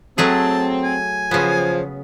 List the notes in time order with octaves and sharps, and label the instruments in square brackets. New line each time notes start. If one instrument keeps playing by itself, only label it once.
[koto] F#3 A3 G#4 [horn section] C4 [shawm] A5
[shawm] G#5
[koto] C#3 B3 [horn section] F3